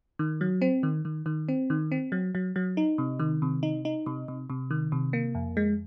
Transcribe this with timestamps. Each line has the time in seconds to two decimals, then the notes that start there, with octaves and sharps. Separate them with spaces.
0.19 D#3
0.41 F#3
0.62 C4
0.83 D#3
1.05 D#3
1.26 D#3
1.49 C4
1.70 D#3
1.92 C4
2.12 F#3
2.35 F#3
2.56 F#3
2.77 D#4
2.98 C3
3.20 D#3
3.42 C3
3.63 D#4
3.85 D#4
4.06 C3
4.28 C3
4.50 C3
4.71 D#3
4.92 C3
5.13 A#3
5.35 F2
5.57 G#3